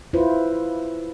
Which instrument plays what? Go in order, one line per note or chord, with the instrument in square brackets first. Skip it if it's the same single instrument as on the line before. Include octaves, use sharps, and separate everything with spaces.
[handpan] E4 F4 B4 C5